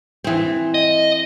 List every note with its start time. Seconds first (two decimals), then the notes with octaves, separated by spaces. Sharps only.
0.24 E3 C4
0.74 D#5